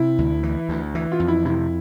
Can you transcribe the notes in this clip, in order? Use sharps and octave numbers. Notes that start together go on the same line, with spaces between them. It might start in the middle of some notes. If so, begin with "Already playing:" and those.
Already playing: C3 E4
D2
E3
D2
E3
F4
F2
E4
C3 E4